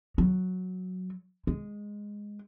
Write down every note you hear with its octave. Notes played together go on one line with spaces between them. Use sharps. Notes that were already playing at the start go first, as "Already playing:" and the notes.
F#3
G#3